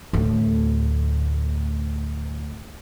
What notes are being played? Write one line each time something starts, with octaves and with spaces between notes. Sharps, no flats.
D2 A2